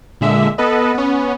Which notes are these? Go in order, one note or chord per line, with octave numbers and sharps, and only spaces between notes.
A#2 D3 G#3 E5
B3 A4 B4 D#5
B3 C#4